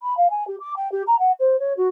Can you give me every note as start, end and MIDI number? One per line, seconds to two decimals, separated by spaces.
0.01 0.14 83
0.17 0.30 77
0.30 0.46 80
0.47 0.56 67
0.60 0.74 86
0.76 0.90 79
0.91 1.02 67
1.07 1.18 82
1.19 1.31 78
1.39 1.59 72
1.59 1.73 73
1.77 1.88 66